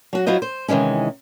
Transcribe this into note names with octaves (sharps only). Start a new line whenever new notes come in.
F#3 F#4
F#3 E4 F4 C5 D#5
C5
C3 D#3 E3 G#3 C#4